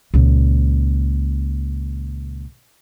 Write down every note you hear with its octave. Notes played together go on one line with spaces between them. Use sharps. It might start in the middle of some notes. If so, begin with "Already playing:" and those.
C#2 A#2